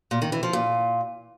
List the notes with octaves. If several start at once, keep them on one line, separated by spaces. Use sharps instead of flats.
A#2
D#3
E3
F3
A#2